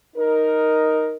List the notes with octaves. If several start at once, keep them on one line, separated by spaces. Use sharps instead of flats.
D#4 A#4